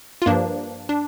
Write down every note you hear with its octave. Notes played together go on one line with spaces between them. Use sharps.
F4
G2 F3 A#3 D4
D4